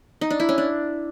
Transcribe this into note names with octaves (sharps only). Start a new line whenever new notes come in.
D#4
D4
E4
C#4
D4